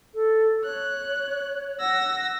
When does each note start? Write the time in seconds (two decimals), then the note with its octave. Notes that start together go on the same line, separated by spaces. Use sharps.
0.14 A4
0.64 C#5 F#6
1.80 F#5 E6 A#6